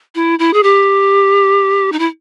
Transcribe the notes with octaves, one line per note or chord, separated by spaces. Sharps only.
E4
E4
G#4
G4
D#4
E4